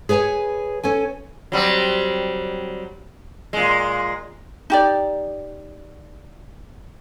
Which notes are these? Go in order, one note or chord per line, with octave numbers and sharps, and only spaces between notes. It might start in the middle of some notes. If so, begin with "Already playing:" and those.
G#4 B4 C#5 G#5
C#4 A4 G#5
F#3 G3 C4
A#2 G#3
D#4 G4 D5